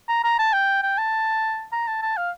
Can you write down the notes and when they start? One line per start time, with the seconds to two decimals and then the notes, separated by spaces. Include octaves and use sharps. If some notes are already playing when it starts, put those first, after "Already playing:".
0.09 A#5
0.24 A#5
0.39 A5
0.53 G5
0.83 G5
0.98 A5
1.73 A#5
1.88 A5
2.02 A5
2.17 F5